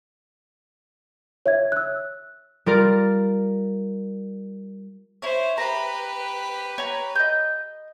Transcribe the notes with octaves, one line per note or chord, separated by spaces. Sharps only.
C#5 E5 G#6
E6 F#6
G3 F4 A#4 D5 F6
E4 C5 C#5
G4 B4 A#5
C#5 A#5
D#5 G6